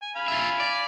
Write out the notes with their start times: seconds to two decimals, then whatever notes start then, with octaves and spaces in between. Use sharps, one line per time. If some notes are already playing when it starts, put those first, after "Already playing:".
0.02 G#5
0.16 F5 G#5 B5
0.28 F4 E5
0.60 D5